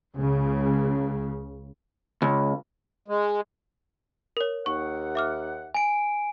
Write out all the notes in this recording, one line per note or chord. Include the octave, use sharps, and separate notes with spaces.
C#2 C#3
C#2
G#3
A#4 C#5
D#2 F#5 C#6
E5 D6 F6
G#5 D7